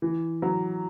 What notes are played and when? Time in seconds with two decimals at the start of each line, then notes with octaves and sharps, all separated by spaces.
0.02 E3
0.42 F#3